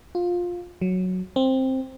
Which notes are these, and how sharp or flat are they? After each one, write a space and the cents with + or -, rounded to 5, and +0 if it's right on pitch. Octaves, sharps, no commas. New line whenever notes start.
F4 +15
F#3 -5
C4 +10